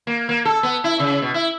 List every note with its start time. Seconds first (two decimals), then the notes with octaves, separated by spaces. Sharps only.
0.07 A#3
0.29 A#3
0.45 A4
0.63 B3
0.84 E4
0.99 C#3
1.22 B2
1.34 E4